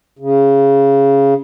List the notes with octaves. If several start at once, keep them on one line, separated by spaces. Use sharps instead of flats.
C#3